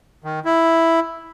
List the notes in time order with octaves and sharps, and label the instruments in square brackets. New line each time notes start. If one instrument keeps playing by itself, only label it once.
[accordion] D#3
E4